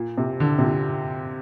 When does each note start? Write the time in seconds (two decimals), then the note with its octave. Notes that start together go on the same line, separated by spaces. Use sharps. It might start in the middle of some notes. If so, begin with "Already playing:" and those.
Already playing: A#2
0.18 C3
0.40 D3
0.59 C3
0.63 A#2